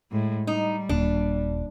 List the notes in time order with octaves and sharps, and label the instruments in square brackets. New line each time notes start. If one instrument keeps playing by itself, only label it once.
[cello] A2 G#3
[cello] G3 [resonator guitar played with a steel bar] D#4
[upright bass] D#1 [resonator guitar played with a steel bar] D4